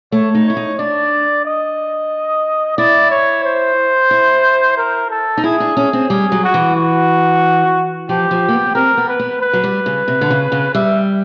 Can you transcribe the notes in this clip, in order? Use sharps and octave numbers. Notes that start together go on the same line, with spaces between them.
A3 C#5
D#4
E4 C#5
D#4
D4 D5
D#5
E4 D5
C#5
C5
E4
A#4
A4
D#4
E4 G#4
D4
C#4
C4
G3 G#4
F#3
F#4
E3
F#4
F3 G4
F3
A#3
B3
B3
C4 A#4
B3
B4
B3
B4
F#3
G3
C#3
C3
D3
C#3
C#3
G3 E5